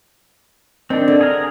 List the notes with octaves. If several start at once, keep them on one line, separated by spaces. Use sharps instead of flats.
D#3 C4 D4
D3
G#4 A#4